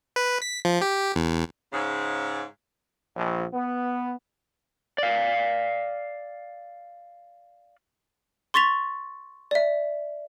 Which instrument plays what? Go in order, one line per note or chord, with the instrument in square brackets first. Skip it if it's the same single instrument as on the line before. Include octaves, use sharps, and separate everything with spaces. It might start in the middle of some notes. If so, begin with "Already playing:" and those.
[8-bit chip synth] B4
B6
F3
G4
E2
[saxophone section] G#2 C#3
[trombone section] A#1
B3
[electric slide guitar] D5 F5
[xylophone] C6 C#6 A6 B6 F7
D5 E5